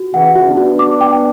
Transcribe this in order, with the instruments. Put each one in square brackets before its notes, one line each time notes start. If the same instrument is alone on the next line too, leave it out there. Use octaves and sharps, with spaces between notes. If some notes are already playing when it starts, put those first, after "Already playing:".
Already playing: [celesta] F#4
[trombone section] C#3 E3 [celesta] F#5
[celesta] F#4
[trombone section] B3 D4
[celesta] F#4
D6
G5